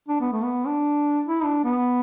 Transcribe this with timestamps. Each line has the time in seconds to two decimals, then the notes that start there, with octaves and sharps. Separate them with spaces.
0.09 D4
0.20 B3
0.32 A3
0.43 B3
0.67 D4
1.26 E4
1.44 D4
1.64 B3